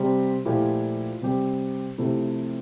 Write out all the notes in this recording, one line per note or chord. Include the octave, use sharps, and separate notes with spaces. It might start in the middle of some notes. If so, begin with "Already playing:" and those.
Already playing: C3 G3 C4 G4
A#2 F3 A3 E4 G4
C3 G3 C4 G4
C3 F3 A3 E4 G4